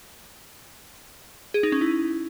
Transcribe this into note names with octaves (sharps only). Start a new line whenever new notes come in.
G#4
D#4
C#4
E4